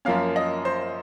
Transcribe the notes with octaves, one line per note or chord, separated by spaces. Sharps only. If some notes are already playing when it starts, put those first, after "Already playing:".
F#2 F3 A#3 C#4 F5
D#5
C5